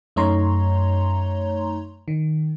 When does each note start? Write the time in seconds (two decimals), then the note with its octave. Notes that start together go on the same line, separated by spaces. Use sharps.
0.16 F#2 A3 D#4 C#5 A#5 C6
2.08 D#3